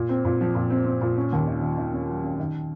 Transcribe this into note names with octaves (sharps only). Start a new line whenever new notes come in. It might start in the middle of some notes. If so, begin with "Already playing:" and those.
Already playing: A#2
C4
A#2
F3
A#2
C4
C4
A#2
C#4
D#2
D#3
D#3
D#3
C#4
F#3
C#4
D#3